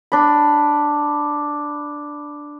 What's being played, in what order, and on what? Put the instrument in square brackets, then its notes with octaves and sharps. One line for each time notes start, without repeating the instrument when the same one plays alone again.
[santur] D4 B5